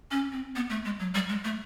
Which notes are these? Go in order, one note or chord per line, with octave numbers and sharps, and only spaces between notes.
C#4
C4
B3
A3
G#3
F#3
G3
G#3
A3